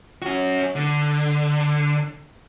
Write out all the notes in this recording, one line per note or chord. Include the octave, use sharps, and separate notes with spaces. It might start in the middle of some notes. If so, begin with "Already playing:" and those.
C#4 F#4
D3